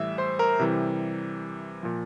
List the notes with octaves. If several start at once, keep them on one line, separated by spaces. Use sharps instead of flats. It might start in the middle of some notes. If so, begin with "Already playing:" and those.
Already playing: A2 E3 G3 E5 E6
C5 C6
A#4 A#5
C3 E3 G3
A#2 F3